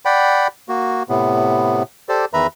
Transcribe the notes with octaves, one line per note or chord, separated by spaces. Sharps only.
D5 F#5 G5 B5
A#3 F#4
A2 C3 B3
G4 A4 C5 D5
E2 D#3 B4 E5 A#5 B5